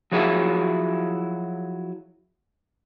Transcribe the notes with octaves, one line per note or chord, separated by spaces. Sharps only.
F3 F#3 E4 G#4 C#5 E5